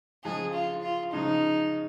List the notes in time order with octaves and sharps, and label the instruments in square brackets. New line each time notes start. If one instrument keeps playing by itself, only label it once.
[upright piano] C#3 F3 G#3 [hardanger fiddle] G#4
[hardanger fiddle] F4
F4
[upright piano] C#3 F3 G#3 [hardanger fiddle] D#4